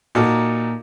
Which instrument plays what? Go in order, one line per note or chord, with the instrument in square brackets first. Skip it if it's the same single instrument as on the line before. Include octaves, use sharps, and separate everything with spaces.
[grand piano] A#2 [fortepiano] D#4 F#4 A4